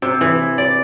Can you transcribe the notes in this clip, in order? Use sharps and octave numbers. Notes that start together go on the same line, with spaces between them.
C3
E3
D5